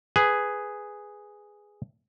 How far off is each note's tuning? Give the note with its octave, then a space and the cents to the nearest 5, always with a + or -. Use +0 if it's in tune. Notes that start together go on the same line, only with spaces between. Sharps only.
G#4 +0 B4 +10